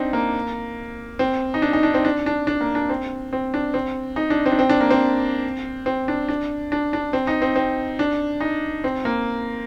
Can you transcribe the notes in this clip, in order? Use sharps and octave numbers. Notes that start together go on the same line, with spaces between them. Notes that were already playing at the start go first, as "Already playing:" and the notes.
Already playing: C4 D4 D#4
A#3
C4
D#4
D4
D#4
D4
C4
D4
D4
D4
A#3
D4
C4
C4
D4
C4
D#4
D4
C4
D4
C4
D4
A#3
C4
C4
D4
D4
D4
D4
C4
D#4
C4
C4
D4
D#4
C4
A#3